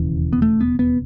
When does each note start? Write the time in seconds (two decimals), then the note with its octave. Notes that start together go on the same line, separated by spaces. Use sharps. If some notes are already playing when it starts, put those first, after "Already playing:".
Already playing: E1 D#2 C#3 E3
0.33 B3
0.42 A3
0.61 B3
0.79 B3